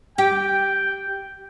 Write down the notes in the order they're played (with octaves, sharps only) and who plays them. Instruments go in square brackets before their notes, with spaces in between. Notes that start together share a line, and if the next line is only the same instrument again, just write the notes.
[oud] G4 [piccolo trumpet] G5